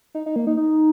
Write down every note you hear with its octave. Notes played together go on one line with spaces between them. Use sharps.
D#4
D#4
A#3
D#4
D#4